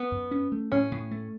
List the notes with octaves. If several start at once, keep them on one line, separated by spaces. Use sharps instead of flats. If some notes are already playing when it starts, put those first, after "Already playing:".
Already playing: B3
F#2
C#4
A3
A2 C#4
A2
A3